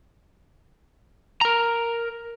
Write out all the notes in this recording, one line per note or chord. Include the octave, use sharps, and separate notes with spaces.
A#4 A#5